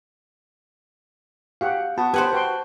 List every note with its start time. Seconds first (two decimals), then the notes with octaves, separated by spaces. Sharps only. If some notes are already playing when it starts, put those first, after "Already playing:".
1.61 F#4 G4 F5 F#5
1.98 B3 F#4 A5
2.14 G4 B4 C5 F#5 G#5
2.33 F#4 B4 G5 C6